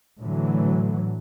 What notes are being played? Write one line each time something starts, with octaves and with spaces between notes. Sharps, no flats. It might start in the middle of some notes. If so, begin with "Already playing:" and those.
A2 D3 E3 F#3